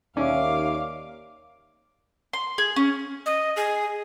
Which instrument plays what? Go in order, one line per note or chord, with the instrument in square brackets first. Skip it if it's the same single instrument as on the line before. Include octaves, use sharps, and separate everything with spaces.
[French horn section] D#2 [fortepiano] C#4 [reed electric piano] D5 E5 [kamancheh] F5 D6
[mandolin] C6
G#4
C#4
[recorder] D#5
G#4